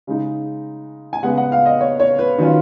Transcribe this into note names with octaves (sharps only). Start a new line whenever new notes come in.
C#3 G#3 D#4
G#5
C#3 G#3 B3 F#5
F#5
F5
D#5
C#5
C#5
B4
D#3 F#3 C#4 F4